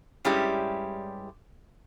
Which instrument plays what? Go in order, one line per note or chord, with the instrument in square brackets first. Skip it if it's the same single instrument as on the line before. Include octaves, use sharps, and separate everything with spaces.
[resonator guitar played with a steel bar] G2 G3 G#3 C#4 E4 G4